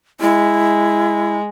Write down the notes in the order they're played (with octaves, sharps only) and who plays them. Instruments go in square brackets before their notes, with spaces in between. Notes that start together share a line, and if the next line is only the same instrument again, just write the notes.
[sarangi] G#3 [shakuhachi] E4